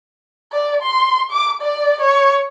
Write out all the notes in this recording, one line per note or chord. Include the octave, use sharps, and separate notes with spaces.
D5
C6
D6
D5
C#5